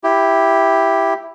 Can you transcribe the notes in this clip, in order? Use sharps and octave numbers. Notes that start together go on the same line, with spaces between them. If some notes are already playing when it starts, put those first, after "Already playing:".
E4 G4